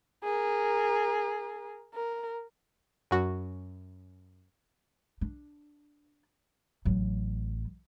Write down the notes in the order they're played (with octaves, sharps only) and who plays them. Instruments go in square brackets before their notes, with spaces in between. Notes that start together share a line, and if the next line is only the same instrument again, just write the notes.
[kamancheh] G#4 A#4
A#4
[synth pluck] F#2 F#4
[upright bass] D4
A1 F#3